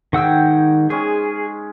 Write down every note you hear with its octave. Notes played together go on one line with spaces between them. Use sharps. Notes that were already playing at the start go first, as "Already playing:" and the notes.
G#2 D#3 F#5 G5 E6
G#3 C#4 G#4